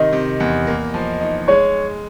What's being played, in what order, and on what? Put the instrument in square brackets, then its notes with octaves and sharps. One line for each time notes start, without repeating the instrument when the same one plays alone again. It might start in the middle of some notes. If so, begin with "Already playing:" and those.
Already playing: [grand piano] C3 D#3 [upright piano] D#5
[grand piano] C3
E2
A#3
F3
D#4
[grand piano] G#3 [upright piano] C#5